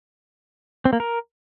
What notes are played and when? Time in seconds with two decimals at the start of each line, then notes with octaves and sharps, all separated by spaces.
0.85 C4
0.93 A#3
1.00 A#4